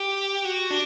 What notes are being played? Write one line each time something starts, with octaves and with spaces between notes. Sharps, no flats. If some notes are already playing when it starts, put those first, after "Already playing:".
Already playing: G4
F#4
D4